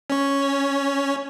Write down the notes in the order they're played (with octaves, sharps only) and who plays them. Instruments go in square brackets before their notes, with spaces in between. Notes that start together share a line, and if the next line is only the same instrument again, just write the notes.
[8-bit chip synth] C#4 C#5